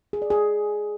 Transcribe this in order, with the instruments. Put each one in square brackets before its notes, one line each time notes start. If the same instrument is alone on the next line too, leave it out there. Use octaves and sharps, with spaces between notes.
[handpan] G#4
D5
G#4